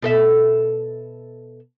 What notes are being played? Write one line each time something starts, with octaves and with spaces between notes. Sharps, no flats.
B2 A4 E5